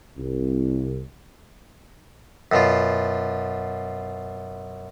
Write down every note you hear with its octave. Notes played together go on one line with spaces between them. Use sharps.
C2
F#2 B2 F4